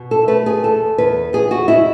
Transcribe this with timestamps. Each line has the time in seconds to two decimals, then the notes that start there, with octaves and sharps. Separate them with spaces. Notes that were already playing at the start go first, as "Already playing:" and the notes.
Already playing: B2
0.11 A4
0.28 A3 B4
0.46 G#4
0.64 E2 A4
0.98 E2 B4
1.33 E2 G#4
1.51 F#4
1.68 G#3 E4